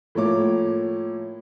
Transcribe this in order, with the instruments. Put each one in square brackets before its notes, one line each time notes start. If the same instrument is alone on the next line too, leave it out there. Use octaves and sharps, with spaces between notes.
[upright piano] A2 F3 A#3 C#5 D6